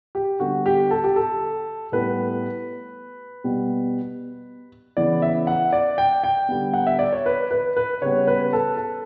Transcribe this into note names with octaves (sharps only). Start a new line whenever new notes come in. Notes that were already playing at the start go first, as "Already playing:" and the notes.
G4
D3 G3 B3 F#4
G4
A4
G4
A4
A2 G3 B3 B4
B2 G3 B3
C#3 E3 B3 D5
E5
F#5
D5
G5
G5
D3 G3 B3
F#5
E5
D5
C#5
B4
B4
B4
C#3 G3 B3 C#5
B4
A4
A4